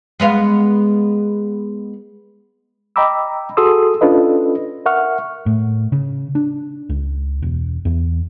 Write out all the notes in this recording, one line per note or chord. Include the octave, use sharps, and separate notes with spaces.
G#3 B3 F5
D#5 G5 A#5 B5 D6 E6
F#4 G#4 A4 C6 D#6 E6
C#4 D4 F4 A4 B4 D#5
A#4 E5 F#5 C#6 F6
A2
C#3
D4
C#2
E1
E2